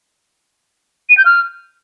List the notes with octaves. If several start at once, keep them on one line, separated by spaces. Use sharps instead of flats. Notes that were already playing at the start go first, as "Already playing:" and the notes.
D#7
G6
F6